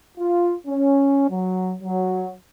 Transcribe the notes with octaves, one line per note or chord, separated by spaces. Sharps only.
F4
C#4
F#3
F#3